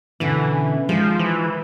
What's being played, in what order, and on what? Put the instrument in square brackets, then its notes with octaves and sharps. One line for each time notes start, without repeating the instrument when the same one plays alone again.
[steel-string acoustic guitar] B2 D3 C#4 [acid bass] E3
[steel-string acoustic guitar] D#3 G#3 [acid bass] F3
[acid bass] E3